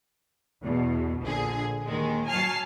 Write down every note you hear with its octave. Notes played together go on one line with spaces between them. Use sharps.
E2 B2
A#1 D3 G#4
D#2 D#3 G#3
F#3 G#5 A5 F6 C7